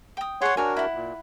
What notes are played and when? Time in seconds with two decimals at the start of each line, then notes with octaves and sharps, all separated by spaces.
0.17 G5 D#6
0.42 G#4 C#5 F#5 C6 C#6
0.57 D4 F#4 A#4 C#5 G#5
0.77 E4 F#5
0.94 A#2